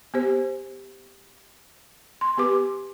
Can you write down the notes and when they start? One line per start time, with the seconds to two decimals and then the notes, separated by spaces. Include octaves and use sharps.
0.14 B3 G4 C5
2.21 C6
2.37 B3 G4 B4 D6